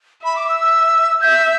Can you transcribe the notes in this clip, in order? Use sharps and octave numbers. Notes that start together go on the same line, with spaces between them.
E5 B5
D6
E6
E6
E5 G6